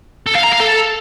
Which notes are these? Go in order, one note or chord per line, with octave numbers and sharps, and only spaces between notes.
A4
F5
A#5
F5
A4